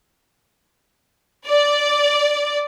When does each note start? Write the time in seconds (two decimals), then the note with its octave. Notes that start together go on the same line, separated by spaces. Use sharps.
1.47 D5